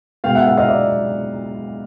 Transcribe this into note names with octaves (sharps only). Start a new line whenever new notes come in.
B2 G#3 F5 G5
E5 F#5
E5 F#5
D#5 F5
D5 E5